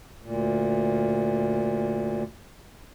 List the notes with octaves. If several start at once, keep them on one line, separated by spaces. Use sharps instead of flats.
D2 A#2